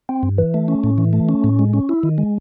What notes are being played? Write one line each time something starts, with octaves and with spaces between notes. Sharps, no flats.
C4
G2
E3
A3
C#4
A2
E3
A3
C#4
A2
G#3
C#4
E4
D#3
G#3